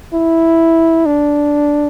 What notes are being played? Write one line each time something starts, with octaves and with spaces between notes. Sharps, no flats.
E4
D4